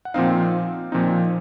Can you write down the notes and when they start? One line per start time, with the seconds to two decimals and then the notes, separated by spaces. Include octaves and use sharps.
0.05 F#5
0.14 A#2 F3 C4 D#4 F5
0.92 A#2 F3 C4 D#4